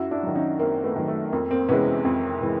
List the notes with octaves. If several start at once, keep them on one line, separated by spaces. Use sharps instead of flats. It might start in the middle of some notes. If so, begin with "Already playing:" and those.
Already playing: F#2 E4 F#4
D4 E4
D#3 F#3
C#4 D#4
F#2 A#3 C4
A3 B3
D#3 F#3
A3
F2 A#3
A#3 C4
C3 E3 G#3 B3 C#4
F2
C3 E3 G#3